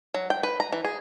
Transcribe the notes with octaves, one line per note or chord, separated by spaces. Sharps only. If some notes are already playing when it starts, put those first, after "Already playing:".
F#3
G5
B4
A#5
E3
G#4